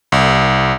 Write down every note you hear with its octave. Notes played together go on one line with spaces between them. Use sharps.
C2